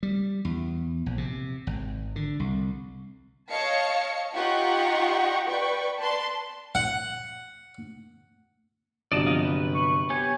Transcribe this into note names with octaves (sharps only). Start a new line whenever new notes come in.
G3
E2
A#1
C3
G#1
D3
C2
C#5 D#5 F5 A5 C#7
D#4 F4 G4 D#5 F#5 C#6
B4 D5 G5 C#6
B4 D5 A5 C6
F#5
G1 C3 F#3 D5 D#5 A5
F3 F4 D#5
B4
C#6
B3 G4 C#5 G#5